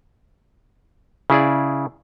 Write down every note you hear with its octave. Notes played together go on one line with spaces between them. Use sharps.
C#3 E4 G#4 D5